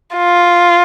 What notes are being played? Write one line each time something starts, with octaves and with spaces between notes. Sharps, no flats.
F4